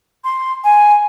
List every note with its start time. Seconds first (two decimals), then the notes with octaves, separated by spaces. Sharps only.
0.23 C6
0.63 G#5